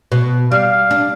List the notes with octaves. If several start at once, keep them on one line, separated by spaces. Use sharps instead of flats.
B2
G3 F5
D4